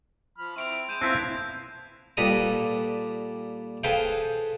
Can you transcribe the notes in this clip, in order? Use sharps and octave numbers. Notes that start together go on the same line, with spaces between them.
F3 B5 F6
C4 E4 C#6 D7 F7
G#3 G6 D#7 E7
B3 C4 E4 F4 A5 F#6 A#6 C7
A#2 G3 A4 B4 A#5 D#6
G#4 A4 B4 C5 F5 G5